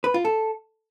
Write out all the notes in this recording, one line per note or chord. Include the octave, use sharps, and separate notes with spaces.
B4
F4
A4